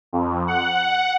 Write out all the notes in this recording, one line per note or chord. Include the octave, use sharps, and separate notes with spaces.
F2
F#5